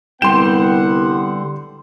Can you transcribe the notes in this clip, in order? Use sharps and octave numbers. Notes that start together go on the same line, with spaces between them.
C2 D3 G3 B3 F#5 G5 C6 E7